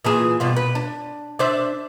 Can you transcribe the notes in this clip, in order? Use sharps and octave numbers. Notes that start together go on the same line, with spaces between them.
A#2 E3 G#4
G2 B2 F4
B4
D4
D4 C5 E5